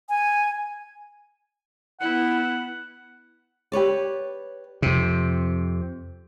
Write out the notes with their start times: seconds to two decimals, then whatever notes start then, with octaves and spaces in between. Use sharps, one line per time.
0.09 G#5
2.01 B3 E4 F#5
3.72 G4 B4 C#5 D5
4.82 F2 C3